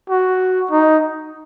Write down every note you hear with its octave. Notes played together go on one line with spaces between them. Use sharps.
F#4
D#4